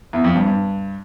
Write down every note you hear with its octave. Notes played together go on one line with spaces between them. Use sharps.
E2
F2
G2
G2